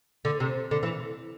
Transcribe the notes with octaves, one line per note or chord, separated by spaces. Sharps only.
D3
C3
D3
E3